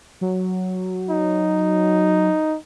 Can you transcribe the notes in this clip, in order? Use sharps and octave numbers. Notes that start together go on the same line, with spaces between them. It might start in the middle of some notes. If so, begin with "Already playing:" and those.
F#3
D#4